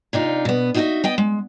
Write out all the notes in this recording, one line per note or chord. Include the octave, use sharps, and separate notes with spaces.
C3 D4 D#4 F4
B2 B3
D#4 F4 F#4 A4 D#5 E5
B3 D#5 G5
G#3